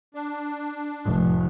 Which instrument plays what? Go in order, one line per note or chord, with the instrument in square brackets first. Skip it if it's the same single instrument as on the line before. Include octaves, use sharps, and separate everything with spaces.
[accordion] D4
[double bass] F1 [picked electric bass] A2 F3